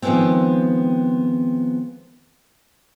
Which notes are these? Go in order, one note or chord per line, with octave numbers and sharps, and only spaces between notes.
D#3 F3 F#3 G#3 B3 C4